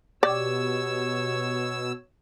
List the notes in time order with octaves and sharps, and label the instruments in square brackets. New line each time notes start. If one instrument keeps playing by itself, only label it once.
[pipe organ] B2 E6 [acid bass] G4 [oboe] C#5 [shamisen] D5